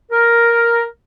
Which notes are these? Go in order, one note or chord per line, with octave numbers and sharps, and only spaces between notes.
A#4